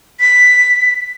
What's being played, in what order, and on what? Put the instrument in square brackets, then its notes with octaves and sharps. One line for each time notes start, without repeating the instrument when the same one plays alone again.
[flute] B6